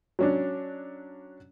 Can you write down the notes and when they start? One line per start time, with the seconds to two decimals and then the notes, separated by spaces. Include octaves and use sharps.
0.19 F#3 C#4 D4